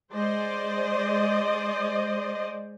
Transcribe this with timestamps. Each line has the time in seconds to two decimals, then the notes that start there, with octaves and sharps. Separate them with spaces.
0.12 G#3 C5 D5 D#5